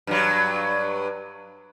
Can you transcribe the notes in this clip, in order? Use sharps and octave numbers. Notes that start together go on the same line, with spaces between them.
G2 F#3